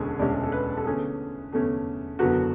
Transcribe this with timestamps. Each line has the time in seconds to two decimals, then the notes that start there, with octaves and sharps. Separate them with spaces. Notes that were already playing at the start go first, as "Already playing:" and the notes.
Already playing: E1 D2 D3 G#3 C#4 G#4 A4
0.19 E1 D2 D3 G#3 C#4 D5
0.43 A4
0.52 B4
0.77 A4
0.85 E2 D3 A3 C#4 G#4
1.53 E2 D3 A3 C#4
2.19 F#1 E2 D3 F#3 B3 F#4